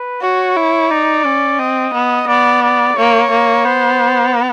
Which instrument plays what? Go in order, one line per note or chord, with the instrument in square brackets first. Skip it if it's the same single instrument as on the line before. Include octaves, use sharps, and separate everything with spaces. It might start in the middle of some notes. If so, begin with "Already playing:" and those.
Already playing: [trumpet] B4
[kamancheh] F#4 [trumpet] C#5
[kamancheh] E4
[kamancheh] D#4 [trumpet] D5
[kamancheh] C#4
[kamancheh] C4 [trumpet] D#5
[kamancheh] B3
[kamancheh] B3 [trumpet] D5
[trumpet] D5
[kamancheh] A#3 [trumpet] C#5
[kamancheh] A#3
[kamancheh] B3 [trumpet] C5